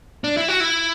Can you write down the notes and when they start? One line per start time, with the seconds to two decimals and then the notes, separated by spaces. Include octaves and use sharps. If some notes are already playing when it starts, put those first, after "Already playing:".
0.24 D4
0.37 E4
0.48 F#4
0.60 E4